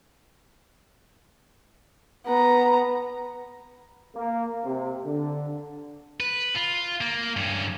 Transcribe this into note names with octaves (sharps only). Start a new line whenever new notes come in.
B3 A#5
A#3
C3
D3
B4
F4
A#3
G2 C#4